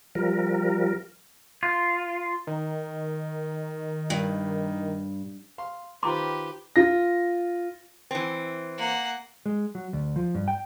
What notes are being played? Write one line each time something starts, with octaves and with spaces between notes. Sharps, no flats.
F3 G3 A#4
F4
D#3
G2
F5 C6
D#3 F4 G4 B4 C5 A#5 C6 D6
F4 A#6
E3 C4
A#3 F#5
G#3
F#3
D2
F3
G2
G5